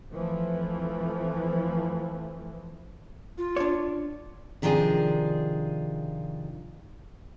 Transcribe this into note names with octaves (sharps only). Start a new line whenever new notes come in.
F2 E3 F3 A3
F4
D4 C#5
C3 D#3 F3 D4 F4 G#4